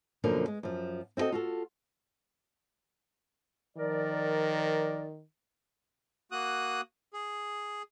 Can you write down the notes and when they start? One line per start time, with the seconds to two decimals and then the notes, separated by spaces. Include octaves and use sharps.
0.24 F#2 B2 D3 F3 A#3 A#4
0.48 G#3
0.63 F#2 F3
1.17 C4 E4 F#4 A4 D#5
1.32 F4 F#4 A4
3.77 D#3 F3 A#4 D5
6.32 A#3 F#4 D#6 F#6
7.14 G#4